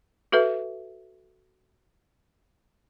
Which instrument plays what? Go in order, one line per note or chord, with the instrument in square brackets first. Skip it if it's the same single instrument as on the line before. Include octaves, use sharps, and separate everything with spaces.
[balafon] F#4 A4 B4 E5